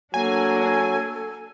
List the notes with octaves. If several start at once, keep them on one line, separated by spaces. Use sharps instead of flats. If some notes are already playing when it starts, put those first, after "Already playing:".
F#3 A#3 D4 A4 G#5